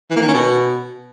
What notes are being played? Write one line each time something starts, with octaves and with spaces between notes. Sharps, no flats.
E3
A#3
D#3
C#4
B2